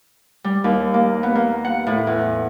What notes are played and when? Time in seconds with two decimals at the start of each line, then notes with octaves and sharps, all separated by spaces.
0.44 G3
0.64 D#2
0.94 A#3
1.23 B3
1.35 A#3
1.65 F#5
1.87 A2
2.07 E2